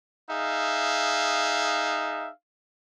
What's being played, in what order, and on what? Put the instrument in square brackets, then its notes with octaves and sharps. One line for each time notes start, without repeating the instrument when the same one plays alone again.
[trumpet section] D#4 G#4 E5 F5